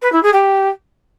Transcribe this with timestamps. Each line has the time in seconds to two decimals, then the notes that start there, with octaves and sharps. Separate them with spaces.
0.02 B4
0.12 E4
0.23 G#4
0.33 G4